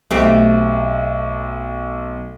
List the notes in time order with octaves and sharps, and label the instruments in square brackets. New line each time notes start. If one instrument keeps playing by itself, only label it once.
[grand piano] B1 [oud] A3 C4 G4